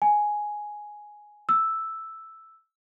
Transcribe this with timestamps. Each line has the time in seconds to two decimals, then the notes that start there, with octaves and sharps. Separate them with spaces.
0.02 G#5
1.49 E6